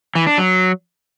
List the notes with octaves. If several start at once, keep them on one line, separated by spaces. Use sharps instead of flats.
E3
D4
F#3